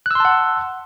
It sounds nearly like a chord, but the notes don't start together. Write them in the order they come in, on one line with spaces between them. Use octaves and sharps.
F#6 E6 C6 A5 F#5